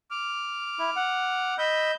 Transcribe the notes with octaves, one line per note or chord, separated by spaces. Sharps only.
D6 F6
E4
F#5
D#5 B5 E6 G6